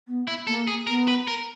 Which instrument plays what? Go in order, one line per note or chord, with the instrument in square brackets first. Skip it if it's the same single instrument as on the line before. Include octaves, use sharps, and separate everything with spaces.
[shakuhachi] B3
[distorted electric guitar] E4
[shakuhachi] A#3 [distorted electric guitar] A4
[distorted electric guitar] G#4
[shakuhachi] B3 [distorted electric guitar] A#4
[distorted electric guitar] B4
A#4